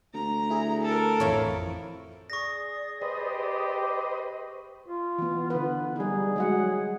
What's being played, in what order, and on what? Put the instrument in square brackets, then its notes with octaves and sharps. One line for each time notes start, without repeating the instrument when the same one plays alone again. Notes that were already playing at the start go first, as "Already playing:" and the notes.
[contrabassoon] D2 [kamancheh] A#5
[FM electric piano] E4 G#4
[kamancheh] A4 A#4
[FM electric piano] A1 C#5 E5 [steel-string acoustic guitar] F2 E3
[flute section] G#4 D5 D#6 [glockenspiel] C#6 A#6
[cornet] G4 [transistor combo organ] B4 C5 D#5
[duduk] F4
[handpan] E3 B3
[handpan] D3 B4 [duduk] B3
[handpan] G3 D#4 [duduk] G#4
[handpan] F#3 G#3 F#5